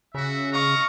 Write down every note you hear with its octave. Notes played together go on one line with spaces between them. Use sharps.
C#3 F#4 E5
D#5 F5 A#5 C#6